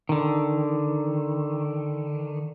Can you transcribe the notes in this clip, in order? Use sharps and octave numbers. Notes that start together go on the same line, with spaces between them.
D3 D#3